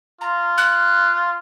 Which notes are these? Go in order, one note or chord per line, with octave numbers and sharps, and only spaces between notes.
F4 A#5
F#6